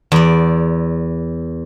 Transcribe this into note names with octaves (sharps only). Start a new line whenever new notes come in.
E2 D5